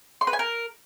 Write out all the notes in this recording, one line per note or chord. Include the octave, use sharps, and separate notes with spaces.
C6
B4
G#5
A#4